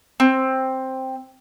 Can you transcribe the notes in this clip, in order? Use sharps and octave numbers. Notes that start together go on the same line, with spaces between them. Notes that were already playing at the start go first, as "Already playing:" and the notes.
C4